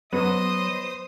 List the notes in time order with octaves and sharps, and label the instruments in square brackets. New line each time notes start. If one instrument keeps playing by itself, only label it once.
[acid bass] F#3 [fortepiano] B3 [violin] C5 D#6 [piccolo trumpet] D#5